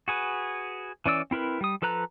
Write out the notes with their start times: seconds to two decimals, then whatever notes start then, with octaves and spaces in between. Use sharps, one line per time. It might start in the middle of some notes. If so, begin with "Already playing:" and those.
0.08 F#4 G#4 B4
1.06 E3 C#4 D5 E6
1.31 C4 E4 A#4 B4
1.61 G3 D#6
1.82 F3 A4 B4 A#5 F#6